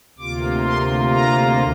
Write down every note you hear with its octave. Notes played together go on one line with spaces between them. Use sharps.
D2 C3 A#3 F4 D6
C6
A#5